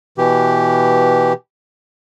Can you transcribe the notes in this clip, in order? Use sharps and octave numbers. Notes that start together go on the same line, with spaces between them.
B2 E3 G4